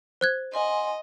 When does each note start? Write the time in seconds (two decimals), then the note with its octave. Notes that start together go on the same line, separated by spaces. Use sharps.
0.21 C5 F#6 G#6
0.54 D#5 F#5 G#5 C6